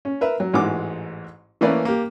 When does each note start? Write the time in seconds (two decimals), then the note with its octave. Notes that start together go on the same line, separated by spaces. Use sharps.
0.05 C#4
0.21 A#4 B4 E5
0.40 F#3
0.53 A1 G#2 E3 F#4 D6
1.61 E3 A3 A#3 C#4 B4 D5
1.85 A#3 G4